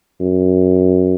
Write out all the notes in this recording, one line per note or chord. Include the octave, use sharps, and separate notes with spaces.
F#2